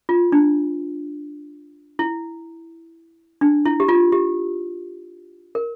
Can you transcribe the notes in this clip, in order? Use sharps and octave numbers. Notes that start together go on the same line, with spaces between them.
F4
D4
E4
D4
E4
G4
F4
G4
A#4